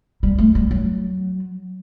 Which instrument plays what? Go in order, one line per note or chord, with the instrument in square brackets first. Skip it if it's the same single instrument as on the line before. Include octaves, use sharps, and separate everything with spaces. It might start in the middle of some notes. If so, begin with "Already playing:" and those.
[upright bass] G3
A3
G3
F#3